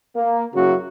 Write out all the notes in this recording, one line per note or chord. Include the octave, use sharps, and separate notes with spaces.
A#3
F#2 C#3 F#3 A#3 E4 F#4